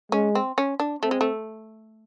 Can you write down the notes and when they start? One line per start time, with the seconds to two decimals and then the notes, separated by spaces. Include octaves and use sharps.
0.12 G#3 C#4
0.35 C4
0.58 C#4
0.80 D4
1.03 A3 C4
1.11 G#3
1.21 A3